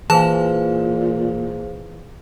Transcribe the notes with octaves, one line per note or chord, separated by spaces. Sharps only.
A#2 E3 G#4 C5 F5 A5